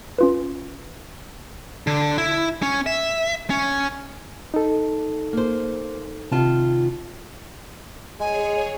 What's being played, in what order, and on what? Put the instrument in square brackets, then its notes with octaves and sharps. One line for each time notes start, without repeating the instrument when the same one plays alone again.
[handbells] C#4 F4 B4
[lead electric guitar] D3
E4
C#4
E5
C#4
[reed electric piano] D#4 A4
[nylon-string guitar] A#3 C5
[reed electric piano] C3 [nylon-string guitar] D#3 F4 A5
[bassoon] G#3 [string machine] G#4 C#5 [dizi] G#5